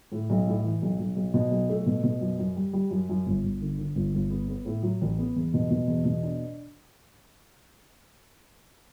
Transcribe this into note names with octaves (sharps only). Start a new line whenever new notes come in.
A2
B1
A2
E3
B1
B1
B1
B2
B1
A3
B2
B2
F#2
F#2
G3
G3
F#2
F#2
G1
G1
D3
D3
G1
G1
B3
B3
A2
F#3
A1
B3
E2
B2
B2
E2
B2
D4